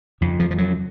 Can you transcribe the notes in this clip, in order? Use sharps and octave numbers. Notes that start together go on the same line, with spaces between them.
F2 C#3
F3
F3
F#3